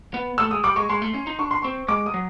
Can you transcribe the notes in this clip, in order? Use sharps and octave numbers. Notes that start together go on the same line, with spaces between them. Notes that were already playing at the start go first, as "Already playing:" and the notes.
B3
A3 E6
G#3 D#6
G3 D6
G#3 C#6
G#3 C6
A3
C#4
D#4
D4 C#6
C6
C4 C#6
G#3 D6
D#6
F#3